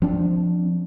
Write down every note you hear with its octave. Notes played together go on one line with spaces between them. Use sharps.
F3 C4 D4